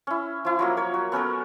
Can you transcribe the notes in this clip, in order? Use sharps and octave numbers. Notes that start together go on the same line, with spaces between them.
C#4 E4
F3 E4
F3 F#3 A#3
A#4 C#5
F#4
B3 C#4 A4 A#4